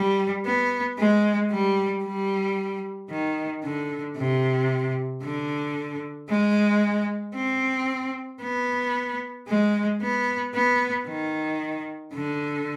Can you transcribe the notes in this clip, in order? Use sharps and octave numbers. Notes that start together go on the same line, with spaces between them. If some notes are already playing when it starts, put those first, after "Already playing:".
Already playing: G3
B3
G#3
G3
G3
D#3
D3
C3
D3
G#3
C4
B3
G#3
B3
B3
D#3
D3